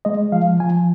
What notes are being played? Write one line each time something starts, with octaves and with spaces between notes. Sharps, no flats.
G#3 D#5
F3 F5
F3 G#5